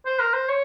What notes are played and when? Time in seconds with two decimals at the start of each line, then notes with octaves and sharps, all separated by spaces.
0.06 C5
0.19 A#4
0.33 C5
0.49 C#5